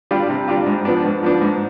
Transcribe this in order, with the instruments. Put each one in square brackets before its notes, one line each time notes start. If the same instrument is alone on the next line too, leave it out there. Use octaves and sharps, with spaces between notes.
[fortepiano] G3 D4 F4
C3
G3 D4 F4
G#2
F3 B3 D4
G#2
F3 B3 D4
G#2